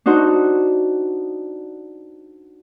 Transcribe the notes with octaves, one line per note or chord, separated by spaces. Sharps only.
D4 D#4 F#4 C5